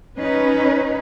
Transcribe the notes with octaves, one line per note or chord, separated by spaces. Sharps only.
C#4 D#4 B4